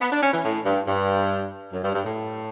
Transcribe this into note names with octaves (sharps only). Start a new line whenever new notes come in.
B3
D4
C#4
E3
A2
G2
G2
F#2
G2
G2
A2